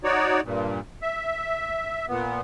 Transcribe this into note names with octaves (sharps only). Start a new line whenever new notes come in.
D#4 F#4 C#5 D5
G2 A#2
E5
A#2 B3